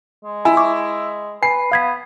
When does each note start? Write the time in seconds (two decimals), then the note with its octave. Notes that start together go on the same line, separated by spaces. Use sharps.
0.24 G#3
0.45 E4 G#5
0.57 C#6 D6
1.43 B4 G#5 C7
1.72 B3 F5 G#6 B6